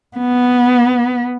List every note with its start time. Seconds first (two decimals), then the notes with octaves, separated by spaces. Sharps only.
0.18 B3